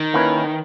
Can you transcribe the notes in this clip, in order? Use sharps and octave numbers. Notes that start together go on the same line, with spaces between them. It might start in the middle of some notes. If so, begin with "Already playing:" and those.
Already playing: D#3
A#3 C#4 E4 B4